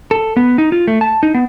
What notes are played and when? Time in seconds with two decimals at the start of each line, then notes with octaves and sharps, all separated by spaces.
0.11 A4
0.37 B3
0.58 D#4
0.72 F4
0.88 A3
1.01 A5
1.23 D#4
1.35 B3